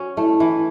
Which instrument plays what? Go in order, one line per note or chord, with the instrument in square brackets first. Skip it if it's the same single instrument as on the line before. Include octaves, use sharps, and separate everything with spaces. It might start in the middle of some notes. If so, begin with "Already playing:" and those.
Already playing: [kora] C#4 F#4
[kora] A3 [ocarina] E4
[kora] E3